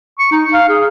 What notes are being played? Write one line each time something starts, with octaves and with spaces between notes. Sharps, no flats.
C#6
D#4
F5
G#4